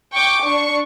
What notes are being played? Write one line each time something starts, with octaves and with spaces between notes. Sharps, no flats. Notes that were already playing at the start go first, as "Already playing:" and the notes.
G5 C#6 D6
D4 C#6